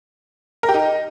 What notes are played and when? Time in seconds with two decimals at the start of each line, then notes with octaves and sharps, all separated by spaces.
0.63 A#4
0.69 G4
0.74 D#4